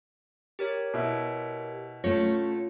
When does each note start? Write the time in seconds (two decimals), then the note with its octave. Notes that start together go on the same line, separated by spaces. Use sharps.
0.59 G4 A#4 C#5
0.94 B2 E4
2.04 A3 C#4 F4 C#5